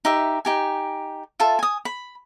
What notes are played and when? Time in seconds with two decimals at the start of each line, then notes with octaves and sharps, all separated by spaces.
0.05 D#4 G4 E5
0.45 D#4 G4 G#5
1.40 F4 A4 E5
1.59 G#5 D#6
1.85 B5